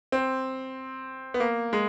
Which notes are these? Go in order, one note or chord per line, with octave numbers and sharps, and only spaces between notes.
C4
B3
A#3
G#3